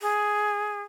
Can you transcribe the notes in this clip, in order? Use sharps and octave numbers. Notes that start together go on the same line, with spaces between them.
G#4